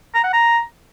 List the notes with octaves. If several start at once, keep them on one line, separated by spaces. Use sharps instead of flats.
A#5
F#5
A#5